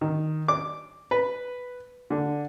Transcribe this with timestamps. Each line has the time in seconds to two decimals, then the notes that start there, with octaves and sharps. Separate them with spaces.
0.01 D#3
0.48 D6
1.11 B4
2.10 D3